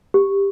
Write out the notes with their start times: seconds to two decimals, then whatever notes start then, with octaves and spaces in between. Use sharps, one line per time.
0.14 G4